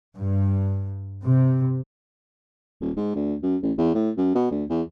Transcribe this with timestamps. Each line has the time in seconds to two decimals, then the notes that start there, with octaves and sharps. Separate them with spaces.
0.17 G2
1.24 C3
2.81 D#1
2.97 G#2
3.15 D2
3.43 F#2
3.63 A1
3.78 E2
3.95 A2
4.17 F#2
4.35 B2
4.51 D2
4.70 E2